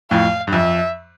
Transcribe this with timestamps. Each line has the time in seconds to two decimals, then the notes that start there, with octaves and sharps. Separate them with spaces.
0.11 F2 A2 F5
0.47 G2
0.53 F2 E5